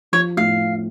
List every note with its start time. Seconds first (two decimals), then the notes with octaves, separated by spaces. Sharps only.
0.13 F3 C#5
0.37 A2 F5